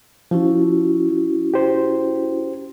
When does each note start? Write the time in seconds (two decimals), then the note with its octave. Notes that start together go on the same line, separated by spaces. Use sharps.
0.31 F3 C#4 E4 F#4
1.54 G4 C5